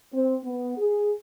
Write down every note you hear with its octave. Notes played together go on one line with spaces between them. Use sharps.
C4
B3
G#4